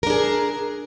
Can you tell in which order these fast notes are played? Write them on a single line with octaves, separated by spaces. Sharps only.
A#4 D4 G#4